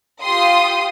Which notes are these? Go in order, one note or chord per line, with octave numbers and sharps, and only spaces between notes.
F4 G4 C6 D#6